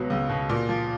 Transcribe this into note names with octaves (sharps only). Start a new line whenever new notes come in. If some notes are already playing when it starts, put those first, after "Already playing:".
Already playing: C#2 B2 F#3 B3
C#2
B2
A#2
F3